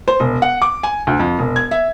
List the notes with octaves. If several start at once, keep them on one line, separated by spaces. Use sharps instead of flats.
C5
E1
F#5
D6
G#5
D2
F2
E1
G#6
E5